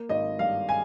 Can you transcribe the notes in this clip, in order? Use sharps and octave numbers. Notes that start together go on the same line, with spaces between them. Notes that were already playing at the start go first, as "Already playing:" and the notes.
Already playing: A#3
G#1 D#5
G2 F5
G#5